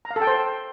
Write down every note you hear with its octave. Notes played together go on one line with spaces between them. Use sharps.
A#5
F5
A4
G5
C5